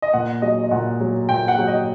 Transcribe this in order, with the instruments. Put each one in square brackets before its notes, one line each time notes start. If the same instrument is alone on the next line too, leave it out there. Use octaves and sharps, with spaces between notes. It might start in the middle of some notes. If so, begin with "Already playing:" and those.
[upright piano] D#5
A#2 F#5
F#3 D#5
D#5
A#2 F#5
F#3
A#2 G5
F#5
F#3
D#5